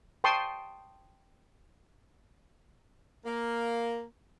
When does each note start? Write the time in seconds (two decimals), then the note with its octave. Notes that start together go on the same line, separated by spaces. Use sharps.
0.24 G5 A5 C6 C#6 D#6
3.25 A#3